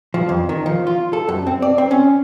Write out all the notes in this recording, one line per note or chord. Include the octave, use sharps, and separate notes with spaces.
F3
F2
D#3
F3
F4
A4
F#2
C4
D5
C4
C#4